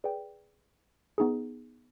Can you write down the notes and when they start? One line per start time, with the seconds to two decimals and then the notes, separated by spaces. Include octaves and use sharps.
0.04 G#4 B4 D5 G5
1.18 B3 D#4 G#4